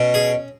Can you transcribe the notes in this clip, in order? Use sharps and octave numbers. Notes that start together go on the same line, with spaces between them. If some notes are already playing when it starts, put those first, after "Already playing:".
Already playing: B2 C#4
G#4